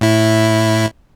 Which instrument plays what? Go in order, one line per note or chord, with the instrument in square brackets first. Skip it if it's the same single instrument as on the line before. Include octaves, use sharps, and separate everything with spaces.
[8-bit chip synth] A2 E4